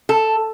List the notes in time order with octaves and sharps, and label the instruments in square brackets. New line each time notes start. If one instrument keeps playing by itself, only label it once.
[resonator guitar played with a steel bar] A4